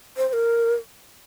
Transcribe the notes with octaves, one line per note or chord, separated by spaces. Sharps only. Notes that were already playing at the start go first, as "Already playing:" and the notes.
C5
C5
A#4